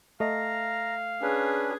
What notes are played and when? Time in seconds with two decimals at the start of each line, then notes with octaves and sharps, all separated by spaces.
0.20 A3 D#5 F5 A#5
1.22 C#4 D4 G#4 B4